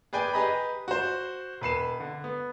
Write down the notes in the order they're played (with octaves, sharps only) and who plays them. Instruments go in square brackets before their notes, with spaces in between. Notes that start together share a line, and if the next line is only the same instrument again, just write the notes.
[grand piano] G#4 B4 D5 G5 G#5
G4 G#4 B4 D#5 A#5 B5
F#4 C5
E1 B4 C7 E7
D3
B3